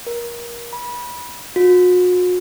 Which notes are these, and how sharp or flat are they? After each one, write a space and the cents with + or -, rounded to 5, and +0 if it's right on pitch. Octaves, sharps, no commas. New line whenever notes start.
A#4 +25
B5 -25
F#4 -40